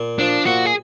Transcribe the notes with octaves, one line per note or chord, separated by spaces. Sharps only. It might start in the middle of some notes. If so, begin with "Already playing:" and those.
Already playing: A#2
F3 D4
A#2 F#4
G#4